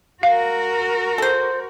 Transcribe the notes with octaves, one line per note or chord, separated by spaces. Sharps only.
F#4 A#4 F5
A4 C5